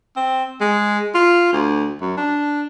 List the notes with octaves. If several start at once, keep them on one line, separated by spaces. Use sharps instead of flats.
C4
G#3
F4
D2
F#2
D4